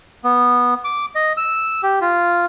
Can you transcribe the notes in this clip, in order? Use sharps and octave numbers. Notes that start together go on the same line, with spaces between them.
B3
D6
D#5
E6
G4
F4